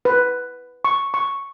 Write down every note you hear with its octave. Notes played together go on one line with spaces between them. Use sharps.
B4
C#6
C#6